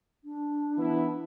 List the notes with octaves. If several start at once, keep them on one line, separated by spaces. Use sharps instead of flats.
D4
E3 B3 E4